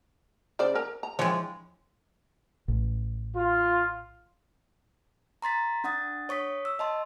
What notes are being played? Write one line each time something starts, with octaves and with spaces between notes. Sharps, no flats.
C#3 C5 D5
A#4 A#5
A#5
E3 F3 G#3 C#5
A1
F4
A#5 C6 A6 B6
D4 F#5 D#6 A6
C#5 C#6 D#6 B6
E6
D#5 A5 C6